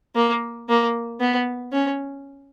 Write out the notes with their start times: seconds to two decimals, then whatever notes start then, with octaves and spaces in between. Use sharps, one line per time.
0.15 A#3
0.69 A#3
1.20 B3
1.72 C#4